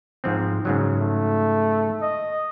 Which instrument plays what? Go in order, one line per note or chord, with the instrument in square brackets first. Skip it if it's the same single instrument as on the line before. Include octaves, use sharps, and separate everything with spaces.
[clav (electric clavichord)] G#2 F3 C4
G#2 C#3 F#3
[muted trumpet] A3
D#5